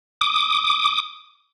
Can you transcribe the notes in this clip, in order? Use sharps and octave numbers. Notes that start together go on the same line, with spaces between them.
D6 D#6